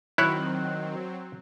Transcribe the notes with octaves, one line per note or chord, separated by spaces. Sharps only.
D#3 F#3 C4 E4 C#5 F#6